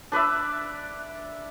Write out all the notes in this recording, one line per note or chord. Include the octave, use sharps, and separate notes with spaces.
D4 B4 D5 E5